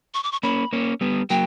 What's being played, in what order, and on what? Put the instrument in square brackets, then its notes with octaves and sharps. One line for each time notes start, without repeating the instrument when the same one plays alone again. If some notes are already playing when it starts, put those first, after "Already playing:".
[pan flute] C#6
D6
C#6
[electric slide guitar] A#3 C#4 [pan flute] B5
[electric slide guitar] A#3 C#4
G3 B3
[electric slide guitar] F#3 A#3 [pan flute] G5